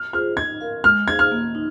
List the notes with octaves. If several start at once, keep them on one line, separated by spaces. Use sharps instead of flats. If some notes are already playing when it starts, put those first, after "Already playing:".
Already playing: F6
F4 G#4 C5 F6
D#4 G#6
A#4 F5
G#3 F6
D#4 G#4 C5 F5 G#6
F6
A#3
D#4